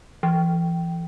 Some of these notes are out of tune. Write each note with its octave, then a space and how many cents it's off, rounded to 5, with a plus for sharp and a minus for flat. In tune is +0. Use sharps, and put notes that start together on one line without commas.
E3 +40